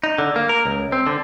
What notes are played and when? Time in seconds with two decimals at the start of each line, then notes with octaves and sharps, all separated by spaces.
0.04 D#4
0.18 D3
0.36 A#3
0.49 A#4
0.66 C#2
0.92 C4
1.07 D3